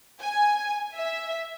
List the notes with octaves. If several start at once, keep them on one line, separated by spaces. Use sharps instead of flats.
G#5
E5